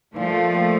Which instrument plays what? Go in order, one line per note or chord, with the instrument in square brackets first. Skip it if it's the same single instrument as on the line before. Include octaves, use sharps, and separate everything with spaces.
[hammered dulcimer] A#2 [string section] F3 A3
[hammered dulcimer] C4